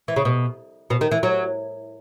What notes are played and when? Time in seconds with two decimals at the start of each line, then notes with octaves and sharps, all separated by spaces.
0.08 E3
0.16 C#3
0.25 B2
0.90 B2
1.01 D#3
1.11 E3
1.23 F#3